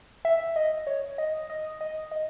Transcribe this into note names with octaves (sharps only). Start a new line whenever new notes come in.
E5
D#5
C#5
D#5
D#5
D#5
D#5